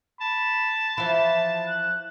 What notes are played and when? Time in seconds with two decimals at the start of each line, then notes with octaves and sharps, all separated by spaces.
0.21 A5 B5
0.98 E3 F3 B5
1.67 F#6